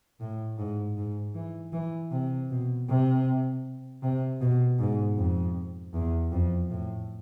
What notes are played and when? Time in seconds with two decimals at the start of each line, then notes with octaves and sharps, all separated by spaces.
0.20 A2
0.58 G#2
0.97 G#2
1.35 E3
1.73 E3
2.12 C3
2.50 B2
2.88 C3
4.03 C3
4.41 B2
4.79 G#2
5.17 F2
5.94 E2
6.32 F2
6.70 A2